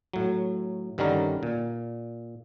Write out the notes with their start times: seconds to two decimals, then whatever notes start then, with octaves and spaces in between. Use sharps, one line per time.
0.13 A2 F#3
0.98 G2 D3 D#3 G3 C#4 A#4
1.43 A#2